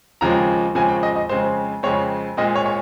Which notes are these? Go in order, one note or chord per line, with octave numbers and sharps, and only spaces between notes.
D#2 C#3 F3 G#3 C4 A#5
D#2 C#3 F3 G#3 C4 G#5
G5
D#5
D#5
F2 C#3 G#3 C4 C5
F2 C#3 G#3 C4 C#5
A#2 G#3 C4 D#5
C#5
C#5